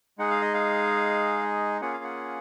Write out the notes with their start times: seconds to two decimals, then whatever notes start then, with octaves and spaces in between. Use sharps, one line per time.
0.18 G#3 D#4 G#4 F#5
0.30 F5
0.42 D#5
0.54 F5
1.81 A#3 C#4 F4 G#4 F#5
1.93 F5
2.04 F#5